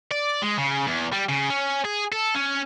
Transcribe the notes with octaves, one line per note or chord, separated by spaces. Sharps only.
D5
G#3
C#3
E2
G3
C#3
C#4
G#4
A4
C#4